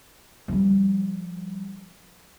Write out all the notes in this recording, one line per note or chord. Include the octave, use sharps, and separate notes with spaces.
F3 G3